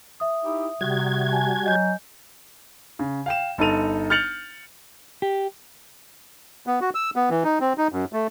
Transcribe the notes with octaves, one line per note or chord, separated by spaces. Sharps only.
E5 D#6
D#4 E4 G4
C3 G3 F#4 G#6
G#5 A5
F#3 D#5 G#5 G6
C#3
F5 G5 E7
G1 D#4 A4 D#7 F7
F6 G6 A6 C#7 F7 F#7
G4
B3
F#4
E6
B3
E3
D#4
C4
D#4
F#2
A3